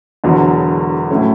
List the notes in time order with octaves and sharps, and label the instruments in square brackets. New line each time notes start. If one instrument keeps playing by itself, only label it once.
[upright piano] E1 E2 D3 F#3
A2 F#3 A3 C#4